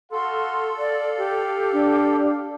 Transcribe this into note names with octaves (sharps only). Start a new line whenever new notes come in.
F#4 A4 F5 C6
D5 F5
G4
D4